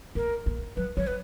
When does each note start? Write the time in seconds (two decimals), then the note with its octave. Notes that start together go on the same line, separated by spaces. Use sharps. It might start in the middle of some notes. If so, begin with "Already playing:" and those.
0.15 A#3 A#4
0.46 A#3
0.76 F#3 B4
0.97 F#3 C#5
1.07 B4